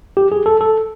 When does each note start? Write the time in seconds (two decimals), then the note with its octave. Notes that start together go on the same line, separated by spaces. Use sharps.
0.17 G4
0.32 G#4
0.46 A4
0.61 A4